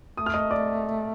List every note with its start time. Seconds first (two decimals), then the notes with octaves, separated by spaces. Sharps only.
0.17 A3 D#6
0.26 F6
0.34 D#5 D#6
0.51 D5 D6